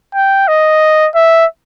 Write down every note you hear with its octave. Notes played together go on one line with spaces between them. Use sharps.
G5
D#5
E5